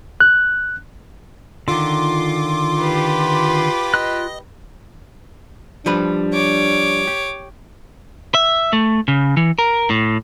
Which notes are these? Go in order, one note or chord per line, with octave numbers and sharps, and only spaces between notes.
F#6
D3 D#3 F4 C6 D6
G4 B4
F4 D#5 C6 F#6
F3 G3 D4 B4
C#5 D6
G4
E5
A3
C#3
E3
A#4
A2